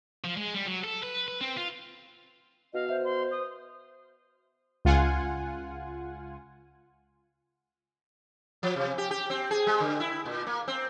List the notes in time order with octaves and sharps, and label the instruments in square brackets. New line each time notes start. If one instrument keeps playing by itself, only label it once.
[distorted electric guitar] F3
G#3
G3
F#3
A4
B4
B4
C4
F4
[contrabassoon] B2 [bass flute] D#5 [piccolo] F5
[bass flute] C5 [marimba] E5
[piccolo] C6
D#6
[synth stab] C#2 F4 F#5 G#5
[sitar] F3
C3
G4
G4
C4
G#4
G#3
D3
E4
A#2
A#3
C4